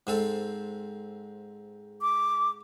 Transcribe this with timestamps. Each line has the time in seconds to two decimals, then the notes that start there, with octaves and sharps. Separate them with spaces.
0.07 G#2 C4 A4
2.02 D6